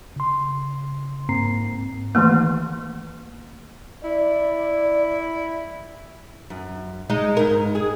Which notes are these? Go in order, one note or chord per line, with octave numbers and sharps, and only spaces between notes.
C#3 C6
G#2 A#3 C4 A#5 C7
D#3 E3 A3 A#3
E4 D5
F#2
G#3 D#4 D#5
G#2 A#4
G#4